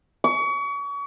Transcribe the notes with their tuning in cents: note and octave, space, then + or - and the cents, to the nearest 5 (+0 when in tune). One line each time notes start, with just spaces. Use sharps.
C#6 +35